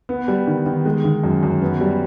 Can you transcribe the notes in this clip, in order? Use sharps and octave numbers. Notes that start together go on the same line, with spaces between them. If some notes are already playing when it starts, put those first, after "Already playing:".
B3
G3
D#3
D#3
G#3
D#3
F#2
F#2
B3
G3